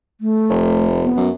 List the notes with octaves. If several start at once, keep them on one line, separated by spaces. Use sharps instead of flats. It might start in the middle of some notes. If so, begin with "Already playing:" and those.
A3
F1
B3
F#2